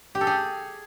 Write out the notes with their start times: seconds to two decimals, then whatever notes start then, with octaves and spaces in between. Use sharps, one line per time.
0.15 G4
0.21 A4
0.27 G#4